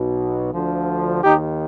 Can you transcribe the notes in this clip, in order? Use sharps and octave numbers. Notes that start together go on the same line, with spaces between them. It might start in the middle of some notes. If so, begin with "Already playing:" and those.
Already playing: B1 B2
D2 D3 F3
D#2 D#3 D#4 G4